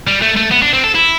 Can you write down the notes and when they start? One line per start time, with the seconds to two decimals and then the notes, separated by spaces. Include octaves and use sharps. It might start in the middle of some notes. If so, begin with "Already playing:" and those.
0.07 G3
0.22 A3
0.36 A3
0.51 B3
0.62 D4
0.73 C4
0.84 A4
0.95 E4